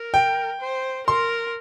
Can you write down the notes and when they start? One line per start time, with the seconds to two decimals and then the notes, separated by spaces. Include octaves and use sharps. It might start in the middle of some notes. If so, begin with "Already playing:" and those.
Already playing: A#4
0.14 G5
0.61 C5
1.07 A#4 C6